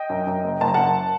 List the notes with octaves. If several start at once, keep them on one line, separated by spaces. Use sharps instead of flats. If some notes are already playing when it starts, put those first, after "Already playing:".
Already playing: D#5 G5
F#2
F#2
F#1
F#1 A5
A#5
F#2 F#5 A5